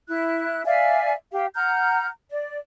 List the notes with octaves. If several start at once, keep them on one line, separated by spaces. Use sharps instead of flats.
E4 F#6
D5 E5 F5 G#5
G4 F5
F#5 A#5 F6 G6
D5